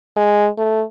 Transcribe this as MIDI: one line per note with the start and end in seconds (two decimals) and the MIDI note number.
0.17 0.48 56
0.58 0.83 57